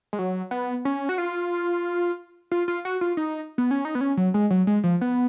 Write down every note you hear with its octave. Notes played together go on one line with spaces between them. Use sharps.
G#3
F#3
B3
C#4
F#4
F4
F4
F4
F#4
F4
D#4
B3
C#4
D#4
B3
C#4
F#3
G#3
F#3
G#3
F3
B3